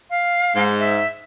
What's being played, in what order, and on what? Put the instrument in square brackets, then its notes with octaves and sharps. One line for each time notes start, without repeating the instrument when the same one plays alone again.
[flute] F5
[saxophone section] G#2
[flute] E5